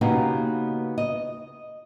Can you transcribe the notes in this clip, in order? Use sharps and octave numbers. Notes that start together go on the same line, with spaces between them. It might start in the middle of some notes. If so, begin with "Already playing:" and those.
C#3 A#3 B3 D#4 F#4 G4
D#5